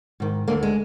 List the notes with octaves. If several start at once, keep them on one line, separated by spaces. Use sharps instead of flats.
G#2 D#3
D2 D3 A#3
G#3